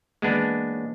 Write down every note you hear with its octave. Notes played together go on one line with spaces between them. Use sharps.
E3 G#3 A#3 B3 D4
D#4 C#5